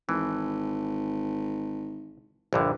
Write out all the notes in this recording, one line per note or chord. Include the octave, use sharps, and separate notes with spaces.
G#1 E3
A#1 G2 D3